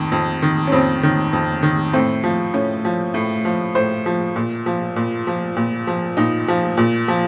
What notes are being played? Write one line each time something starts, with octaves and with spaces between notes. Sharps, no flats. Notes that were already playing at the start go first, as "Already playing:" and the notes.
Already playing: F2 D#3
F2
D#3
C#4
F2 C4
D#3
F2
D#3
A2 C4
F3
A2 C#4
F3
A2
F3
A2 C5
F3
A#2
F3
A#2
F3
A#2
F3
A#2 D#4
F3
A#2
F3